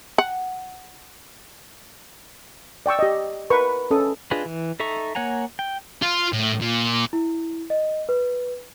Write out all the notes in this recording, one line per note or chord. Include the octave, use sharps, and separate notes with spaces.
F#5
D5 G5 C#6 E6
G4 D#5
A#4 B4 C#6
C#4 A4 D#6
D4 F4 G#4 B4 D#5
E3
D#4 A4 E5 A#5 C#6
A#3 C#5 F#5 G#5 A#5
G5
F4
A2
A#2
E4
D#5
B4